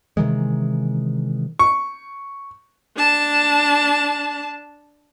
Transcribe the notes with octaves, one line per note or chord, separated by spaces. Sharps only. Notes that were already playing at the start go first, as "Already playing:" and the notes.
C3 D#3 E3 G#3
C#6
D4 A5